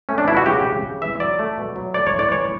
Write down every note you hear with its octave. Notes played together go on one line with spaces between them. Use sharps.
A3 C#4
D4
B2 E4
F#4
C#3 G4
C#3
C#3
E3 E5
F#3 D5
A3
B2
F#3
A3 D5
C#5
A2
D5
E3 C#5